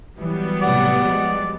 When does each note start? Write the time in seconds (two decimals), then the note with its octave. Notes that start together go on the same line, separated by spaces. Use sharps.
0.19 E3 F#3 G3 B3
0.62 A2 C3 D5 F#5
1.06 F3 G#3